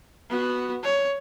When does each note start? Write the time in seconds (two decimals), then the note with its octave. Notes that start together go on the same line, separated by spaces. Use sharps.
0.30 B3 F#4
0.83 C#5